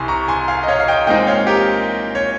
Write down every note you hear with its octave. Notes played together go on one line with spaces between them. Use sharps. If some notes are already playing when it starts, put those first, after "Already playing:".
Already playing: C2 C3 G#5 C6
A#5 C#6
G#5 C6
F5 G#5
D#5
C#5 F5
F5
D#5 G5
A#2 G#3 C4 D#4 D#5 G5
C#5 F5
G4 A#4
C#5